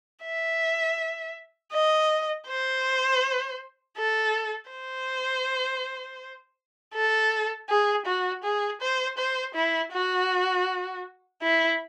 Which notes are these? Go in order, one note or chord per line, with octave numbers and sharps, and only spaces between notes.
E5
D#5
C5
A4
C5
A4
G#4
F#4
G#4
C5
C5
E4
F#4
E4